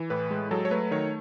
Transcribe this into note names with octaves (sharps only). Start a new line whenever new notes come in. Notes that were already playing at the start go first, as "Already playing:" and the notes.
Already playing: E3
A2 B4
G#3
F#3 A4
C#5
A3 B4
D#3 C#5